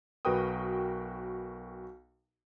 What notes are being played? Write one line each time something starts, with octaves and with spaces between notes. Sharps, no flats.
B1 F#4 A#4 B4 G5 D#6